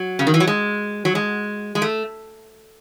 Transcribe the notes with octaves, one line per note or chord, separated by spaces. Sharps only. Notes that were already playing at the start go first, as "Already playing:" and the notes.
Already playing: F#3
C#3
D#3
E3
F#3
G#3
F#3
G#3
G#3
A3